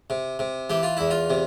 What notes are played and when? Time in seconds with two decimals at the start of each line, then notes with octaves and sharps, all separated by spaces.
0.10 C3
0.39 C3
0.70 E3 G4
0.83 F4
0.97 E2 E4
1.10 F4
1.30 C3